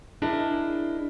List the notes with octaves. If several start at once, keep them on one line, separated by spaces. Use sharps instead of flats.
D4 E4 G#4 A#4 D#5